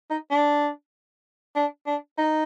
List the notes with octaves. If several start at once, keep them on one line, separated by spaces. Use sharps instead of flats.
D#4
D4
D4
D4
D#4